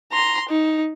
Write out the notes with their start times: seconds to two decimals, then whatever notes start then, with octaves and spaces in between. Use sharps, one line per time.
0.12 A#5 C6
0.49 D#4